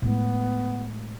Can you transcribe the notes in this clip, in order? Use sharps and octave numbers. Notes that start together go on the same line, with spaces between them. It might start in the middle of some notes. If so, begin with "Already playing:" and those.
A2 G#3 B3